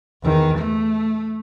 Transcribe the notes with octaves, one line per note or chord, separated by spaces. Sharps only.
E2 D#3
A3